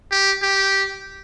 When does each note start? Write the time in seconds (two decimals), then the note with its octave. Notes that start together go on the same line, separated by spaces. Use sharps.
0.11 G4
0.43 G4